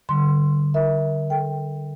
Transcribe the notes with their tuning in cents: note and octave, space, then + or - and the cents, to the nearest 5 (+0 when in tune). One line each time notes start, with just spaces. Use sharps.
D3 +10 G3 -25 C6 +0
A#4 +20 E5 -20
A4 +0 G5 +5